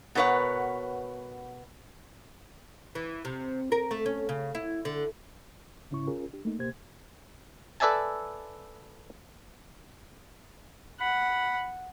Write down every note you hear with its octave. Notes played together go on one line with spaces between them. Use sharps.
B2 A#4 B4 C#5 F#5
E3
C3
A#4
A3
C#4
C#3
E4
D3
G#2 C#3 C#4 E4 C#6
C#4 F4 G#4 A#4
D4 G4
A3 A#3 D#4
C#2 B2 A#3 G4 C5 G#6
A4 B4 D5 E5 G#5 A5
F#5 B5